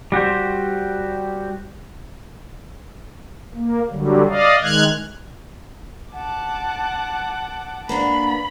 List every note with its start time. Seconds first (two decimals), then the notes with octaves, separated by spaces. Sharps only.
0.12 G3 F#4 G4 C5
3.54 A#3
3.90 D3 F#3 G3
4.28 D5 D#5 F5
4.62 D#3 G#3 F6 F#6 G#6
6.13 F#5 A5 D6
7.89 A#3 B3 D4 B5